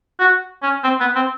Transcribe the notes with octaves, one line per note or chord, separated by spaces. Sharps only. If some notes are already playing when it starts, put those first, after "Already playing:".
F#4
C#4
C4
B3
C4